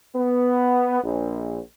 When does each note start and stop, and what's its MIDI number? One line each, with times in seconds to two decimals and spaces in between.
0.15 1.01 59
1.03 1.58 34